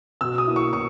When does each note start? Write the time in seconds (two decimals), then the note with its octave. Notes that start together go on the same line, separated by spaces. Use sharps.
0.21 B2 E6
0.38 D#6
0.47 A#3 E4
0.56 C#6
0.73 B2 C#6